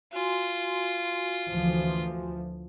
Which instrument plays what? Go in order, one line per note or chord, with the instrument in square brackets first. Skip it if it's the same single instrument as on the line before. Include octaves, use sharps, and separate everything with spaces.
[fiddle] F4 [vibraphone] F#4 G#5 C6
[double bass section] D2 E3 F3